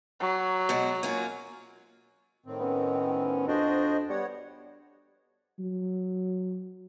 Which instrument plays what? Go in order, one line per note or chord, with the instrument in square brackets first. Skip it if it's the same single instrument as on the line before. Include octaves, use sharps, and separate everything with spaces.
[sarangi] F#3
[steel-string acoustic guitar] B2 G#3 F#4
A#3 C#4 F4
[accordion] A2 D#3 C4
[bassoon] B3 [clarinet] C#4
[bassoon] F2 [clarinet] D4 [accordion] F#4 C5 D#5
[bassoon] G3 [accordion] B3 C#5 F#5
[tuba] F#3